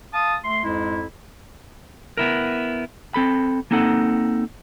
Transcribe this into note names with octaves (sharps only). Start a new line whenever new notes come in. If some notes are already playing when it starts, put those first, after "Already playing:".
F5 A5 D#6
A3 C6
F2 G#2 G#3 E4
B3 E4 A#4
C4 A4 B5
A#3 C4 D#4 A4 F#5